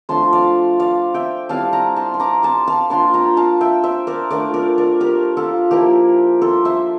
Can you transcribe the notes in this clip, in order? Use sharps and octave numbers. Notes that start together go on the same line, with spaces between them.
F3 A3 D4 A5 C6
D5 F5
D5 F5
E5 G5
G3 C4 E4 F5 A5
G5 A#5
A5 C6
C6
A#5 D6
A5 C6
F5 A5
A#3 D4 F4 A5 C6
G5 A#5
F5 A5
E5 G5
C5 E5
A#4 D5
A3 D4 F4 A#4 D5
A#4 D5
A#4 D5
G4 A#4
F4 A4
F3 A#3 E4 G4 A#4
A4 C5
C5 E5